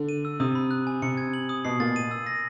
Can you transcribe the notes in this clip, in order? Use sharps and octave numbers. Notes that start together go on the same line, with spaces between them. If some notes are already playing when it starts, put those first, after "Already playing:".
Already playing: D3
D#7
E6
C3 D#6
B5
F#6
G#5
C3 C#7
G#6
F#7
D#6
B2 C7
A#2 A6
D#7
E6
A#6